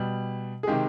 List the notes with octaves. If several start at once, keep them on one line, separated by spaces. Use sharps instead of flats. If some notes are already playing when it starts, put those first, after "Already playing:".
Already playing: B2 G3
G#4
C3 D#3 G#3 G4